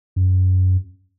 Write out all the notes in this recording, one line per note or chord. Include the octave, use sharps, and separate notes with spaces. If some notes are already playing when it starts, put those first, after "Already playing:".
F#2